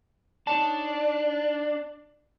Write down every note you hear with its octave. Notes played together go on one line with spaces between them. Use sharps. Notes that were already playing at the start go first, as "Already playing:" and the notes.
D4 D#4 C#5 A5